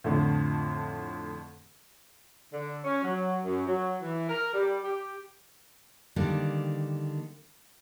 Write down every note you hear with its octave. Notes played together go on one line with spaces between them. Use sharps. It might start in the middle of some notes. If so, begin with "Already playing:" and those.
F2 A2 D3
D3
C#4
F#3
F#2
F#3
E3
A#4
G3
G4
D3 D#3 G3 A#3 D4